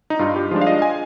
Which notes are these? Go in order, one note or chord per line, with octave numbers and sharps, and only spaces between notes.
D#4
G2 F4
G4
F3 G#3 D4 F4
F5
D#5
G#5